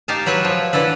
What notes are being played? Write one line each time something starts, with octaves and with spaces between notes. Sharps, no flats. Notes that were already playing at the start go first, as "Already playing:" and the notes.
D#4 G4 F5 G#5 A5
F#3 E4 B4 C#5
F3
D3 E3 E4 A4 B4